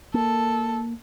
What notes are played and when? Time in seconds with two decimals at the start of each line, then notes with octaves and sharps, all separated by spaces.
0.14 A#3 A4